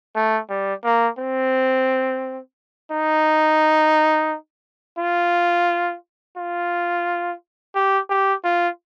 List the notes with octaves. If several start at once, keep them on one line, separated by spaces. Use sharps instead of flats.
A3
G3
A#3
C4
D#4
F4
F4
G4
G4
F4